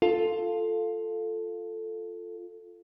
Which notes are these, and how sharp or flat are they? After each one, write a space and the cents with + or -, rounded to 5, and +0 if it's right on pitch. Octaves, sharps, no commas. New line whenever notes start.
F4 +0 A4 +0